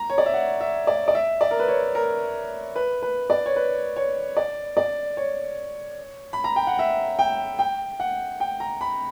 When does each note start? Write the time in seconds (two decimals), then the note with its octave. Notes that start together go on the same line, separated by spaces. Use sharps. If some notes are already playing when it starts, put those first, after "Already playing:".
Already playing: A#5
0.10 C#5
0.18 D5
0.26 E5
0.34 F#5
0.61 E5
0.87 D5
1.08 D5
1.15 E5
1.41 D5
1.51 A#4
1.60 B4
1.68 C#5
1.95 A#4
2.76 B4
3.02 B4
3.30 D5
3.46 C#5
3.56 B4
3.96 C#5
4.37 D5
4.77 D5
5.17 C#5
6.33 B5
6.44 A#5
6.56 G5
6.67 F#5
6.79 E5
7.19 G5
7.59 G5
8.00 F#5
8.40 G5
8.60 A#5
8.81 B5